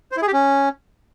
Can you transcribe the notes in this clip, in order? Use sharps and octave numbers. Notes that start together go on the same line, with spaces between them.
C5
E4
G#4
G4
C#4